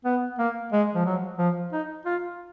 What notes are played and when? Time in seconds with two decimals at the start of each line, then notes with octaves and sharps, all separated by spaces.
0.05 B3
0.39 A#3
0.72 G#3
0.95 F3
1.05 F#3
1.39 F3
1.73 D#4
2.05 F4